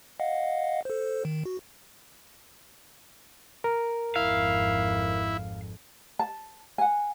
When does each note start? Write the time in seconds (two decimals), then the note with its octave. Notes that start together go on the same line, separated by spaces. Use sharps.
0.20 D#5 F5 F#5
0.85 A4 C5
1.25 D#3
1.46 F#4
3.64 A#4
4.16 G#1 F2 E4 F5
6.19 A5
6.78 F#5 G#5